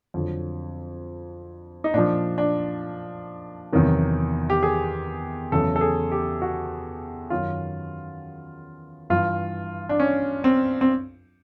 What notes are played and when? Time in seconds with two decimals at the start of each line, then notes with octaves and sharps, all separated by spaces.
0.14 F2 D3 F#3
1.84 D#4
1.94 A#2 F3 D4
2.38 D4
3.72 E2 C3 D#3 F#3
4.50 G4
4.63 G#4
5.52 E2 C#3 F#3 A4
5.76 A4
5.81 G#4
6.12 G4
6.42 F#4
7.30 F#2 D#3 F#3 F4
9.10 G2 E3 F4
9.89 D4
10.00 C#4
10.44 C4
10.81 C4